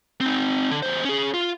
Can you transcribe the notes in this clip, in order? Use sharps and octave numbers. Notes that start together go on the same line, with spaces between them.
C4 D#4
D3
E2 C5
C#4 G#4
F4